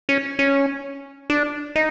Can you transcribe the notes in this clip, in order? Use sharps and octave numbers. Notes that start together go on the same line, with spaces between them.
C#4
C#4
D4
D#4